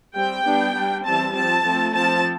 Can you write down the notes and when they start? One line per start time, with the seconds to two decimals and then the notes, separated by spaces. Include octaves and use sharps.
0.15 G3 C4 G5
0.45 G3 B3 D4
0.74 G3 D4
1.04 E3 G3 C4 A5
1.34 F3 C4 A5
1.64 F3 A3 C4
1.94 F3 C4 A5